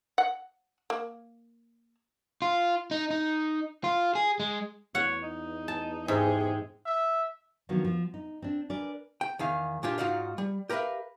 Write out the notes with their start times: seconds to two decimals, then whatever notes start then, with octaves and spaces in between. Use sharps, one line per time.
0.18 F#5
0.90 A#3
2.42 F4
2.91 D#4
3.11 D#4
3.84 F4
4.15 G#4
4.40 G#3
4.95 E2 C#5 F#5
5.23 D#4
5.68 A5
6.08 G#2 C3 G#4 G5
6.86 E5
7.69 D#3 F3 F#3 A#3 B3 D4
7.85 F3
8.14 D#4
8.42 C4 D4
8.70 A#4 B4 D5 G#5
9.21 G5
9.39 E2 D#3 F5
9.83 A#2 A#3 D4 F4 G4
9.98 G#2 D#4 F4 F#4 D5 F5
10.38 G3
10.70 G4 A#4 B4 D5 E5 F5